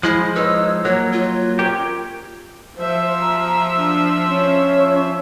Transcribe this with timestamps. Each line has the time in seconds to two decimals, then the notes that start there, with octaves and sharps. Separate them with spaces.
0.03 F3 G#3 E4
0.36 D#4 B4 C#5 E6
0.85 F#3 A#3 C#5
1.12 F4
1.59 C#4 G4 A#4
2.78 F3 C5 E5
3.21 A#5
3.77 D4
4.27 C#4